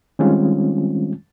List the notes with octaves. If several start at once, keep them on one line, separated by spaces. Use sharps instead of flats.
D#3 G3 G#3 C4 C#4 F4